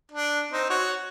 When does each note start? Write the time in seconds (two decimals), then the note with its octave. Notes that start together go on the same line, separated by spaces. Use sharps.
0.12 D4
0.51 C4 D#4
0.70 F#4 C#5